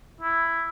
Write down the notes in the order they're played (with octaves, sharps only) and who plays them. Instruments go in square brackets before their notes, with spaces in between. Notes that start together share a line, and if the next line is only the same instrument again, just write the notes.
[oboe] E4